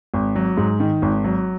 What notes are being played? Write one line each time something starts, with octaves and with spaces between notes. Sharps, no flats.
G#1
F#3
G#2
D#3
G#1
F#3